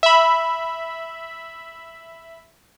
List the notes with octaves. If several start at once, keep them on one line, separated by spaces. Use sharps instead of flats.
E5 B5